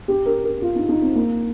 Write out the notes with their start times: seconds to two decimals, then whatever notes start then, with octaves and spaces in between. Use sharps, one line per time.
0.08 G4
0.26 A#4
0.44 A#4
0.62 F4
0.75 D#4
0.89 D#4
1.02 C4
1.15 A#3